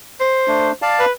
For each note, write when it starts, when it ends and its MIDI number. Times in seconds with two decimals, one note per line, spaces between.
0.20 0.71 72
0.48 0.72 57
0.48 0.72 62
0.82 1.05 74
0.82 1.05 77
0.82 1.05 81
1.00 1.12 71